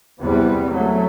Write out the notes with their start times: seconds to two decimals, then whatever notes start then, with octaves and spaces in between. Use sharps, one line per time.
0.21 E2 C3 G3 B3
0.72 F#3 A3